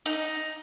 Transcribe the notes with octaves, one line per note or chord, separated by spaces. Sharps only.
D#4